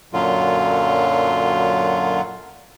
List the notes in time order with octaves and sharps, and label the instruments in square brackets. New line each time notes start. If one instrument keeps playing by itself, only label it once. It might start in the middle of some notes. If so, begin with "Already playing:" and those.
[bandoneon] F#2 A#2 D3 F#3 F4